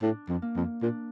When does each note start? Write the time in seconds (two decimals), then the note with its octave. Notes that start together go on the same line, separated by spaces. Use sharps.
0.02 A2 D4
0.29 F2
0.42 A#3
0.56 F2
0.82 A#2 D4